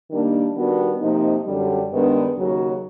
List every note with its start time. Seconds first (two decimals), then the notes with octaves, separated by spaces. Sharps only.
0.11 D#3 G3 A#3 D4
0.56 D#3 G3 B3 D4 F#4
1.01 C3 F3 A#3 D#4
1.46 F#2 D3 G3
1.91 G2 D#3 G#3 B3 D4
2.36 D#2 C#3 F#3